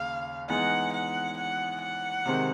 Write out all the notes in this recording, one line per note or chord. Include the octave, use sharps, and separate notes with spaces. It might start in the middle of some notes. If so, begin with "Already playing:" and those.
Already playing: D#2 C#3 F5
E3 G#3 B3 D#4 F#5
F#5
F#5
F#5
C3 D#3 G#3 C4